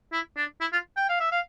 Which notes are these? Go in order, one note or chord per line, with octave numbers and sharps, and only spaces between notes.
E4
D4
E4
F4
G5
F5
E5
F5